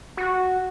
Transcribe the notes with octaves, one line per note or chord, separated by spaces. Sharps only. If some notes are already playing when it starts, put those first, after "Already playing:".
F#4